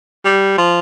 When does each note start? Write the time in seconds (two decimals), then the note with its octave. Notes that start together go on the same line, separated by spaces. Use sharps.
0.25 G3
0.58 F3